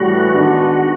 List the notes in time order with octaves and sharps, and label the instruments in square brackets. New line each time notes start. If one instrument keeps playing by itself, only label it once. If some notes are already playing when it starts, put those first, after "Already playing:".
Already playing: [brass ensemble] A2 E3 G3 [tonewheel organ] F#4
[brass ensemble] D#3 G#3 B3 D4